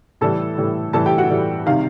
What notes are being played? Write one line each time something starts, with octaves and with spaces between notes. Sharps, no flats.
A2 E3 G3 A4 A5
A2 E3 G3
A2 E3 G3 A4 A5
G4 G5
F#4 F#5
A2 E3 G3
C3 D#3 G3 F5